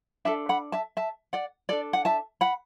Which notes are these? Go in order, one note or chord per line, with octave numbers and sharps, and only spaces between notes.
D4 A4 E5 A5
F#5 B5
E5 A5
E5 A5
D5 F#5
D4 A4 D5
F#5
E5 A5
F#5 B5